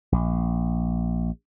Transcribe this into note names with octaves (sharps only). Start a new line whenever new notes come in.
A#1